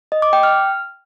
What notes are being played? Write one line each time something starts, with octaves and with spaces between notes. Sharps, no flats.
D#5
D6
G5
F6